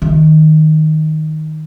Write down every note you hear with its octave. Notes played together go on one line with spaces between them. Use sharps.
D#3